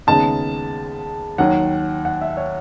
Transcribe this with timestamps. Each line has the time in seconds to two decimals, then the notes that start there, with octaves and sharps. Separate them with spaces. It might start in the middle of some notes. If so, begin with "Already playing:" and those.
0.07 D#2 C#3 G#3 B3 D#4 A5
1.38 D#2 D#3 F#3 F#5
2.05 F#5
2.21 E5
2.37 C#5